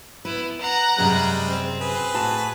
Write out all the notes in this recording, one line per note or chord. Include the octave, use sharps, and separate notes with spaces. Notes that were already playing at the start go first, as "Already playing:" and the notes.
B3 E4 B4
F#5 A#5
F#2 C3 G3 G#3
C4
G#4 B4
A2 F#4 A5